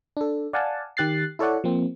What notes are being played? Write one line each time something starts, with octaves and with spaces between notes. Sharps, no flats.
D4 A4
D5 F5 F#5 G#5 A5
D#3 G4 F#6 A6 C7
E4 A4 C#5 D5 F#5
F3 A#3 C4